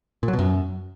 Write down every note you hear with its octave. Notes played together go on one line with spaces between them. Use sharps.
A#2
F#3
B2
F#2